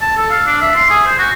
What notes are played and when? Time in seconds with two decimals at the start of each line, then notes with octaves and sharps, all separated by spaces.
0.02 A5
0.17 A4
0.31 F5
0.46 D4
0.61 E5
0.76 C6
0.90 G#4
1.06 C5
1.19 F#4